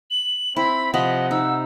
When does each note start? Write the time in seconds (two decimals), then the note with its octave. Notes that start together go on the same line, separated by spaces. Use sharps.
0.11 F#7
0.56 C4 E4 B5
0.94 C3 F3 D#5 F#5 B5
1.31 D#4 E6